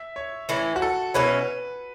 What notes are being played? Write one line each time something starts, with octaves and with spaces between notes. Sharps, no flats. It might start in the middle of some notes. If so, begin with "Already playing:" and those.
Already playing: E5
C#5
A2 E3 C#4 E4
F#4
A4
B2 F#3 C#4 E4 B4